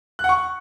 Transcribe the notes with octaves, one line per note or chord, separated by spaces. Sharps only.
F#6
F#5
C#6